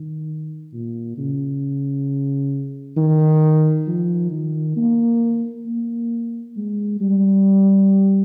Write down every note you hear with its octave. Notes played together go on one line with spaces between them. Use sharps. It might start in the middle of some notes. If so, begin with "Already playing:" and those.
Already playing: D#3
A#2
C#3
D#3
F3
D#3
A#3
A#3
G#3
G3